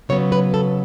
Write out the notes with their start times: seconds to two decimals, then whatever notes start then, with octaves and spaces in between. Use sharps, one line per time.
0.09 C#3 F#3 B3 C#5
0.32 B4
0.54 A4